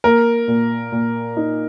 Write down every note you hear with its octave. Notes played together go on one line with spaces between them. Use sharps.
A#3 A#4
A#2
A#2
D#4